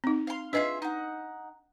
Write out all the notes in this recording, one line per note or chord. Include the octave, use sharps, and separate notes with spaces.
C4 D#4
F5 C6
D4 F4 G#4 B4 D#5 E5
D#4 F#5